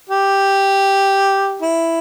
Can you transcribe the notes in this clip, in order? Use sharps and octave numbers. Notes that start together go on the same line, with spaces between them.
G4
E4